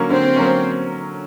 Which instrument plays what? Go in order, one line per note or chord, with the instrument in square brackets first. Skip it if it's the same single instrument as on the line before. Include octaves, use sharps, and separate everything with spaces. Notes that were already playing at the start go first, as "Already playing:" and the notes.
Already playing: [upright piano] D3 F#3 A#3 C#4
[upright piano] D3 [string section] C4
[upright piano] F#3 A#3 C#4